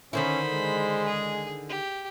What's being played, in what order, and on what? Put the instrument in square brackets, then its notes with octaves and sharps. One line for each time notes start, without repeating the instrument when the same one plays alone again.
[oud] D3 D#3 E4 [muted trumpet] C#4 [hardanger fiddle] C5 B5
[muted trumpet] G#3
[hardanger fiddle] G#4
G4